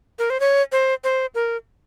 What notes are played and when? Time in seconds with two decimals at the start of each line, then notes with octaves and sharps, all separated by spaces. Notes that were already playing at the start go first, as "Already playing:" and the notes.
0.19 A#4
0.30 C5
0.40 C#5
0.72 C5
1.04 C5
1.35 A#4